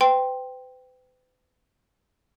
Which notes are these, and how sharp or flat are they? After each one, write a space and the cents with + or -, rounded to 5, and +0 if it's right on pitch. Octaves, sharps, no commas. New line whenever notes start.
B4 +45 G5 +0 C6 +5